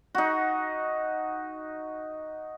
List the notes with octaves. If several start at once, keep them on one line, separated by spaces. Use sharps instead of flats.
D#4 F#4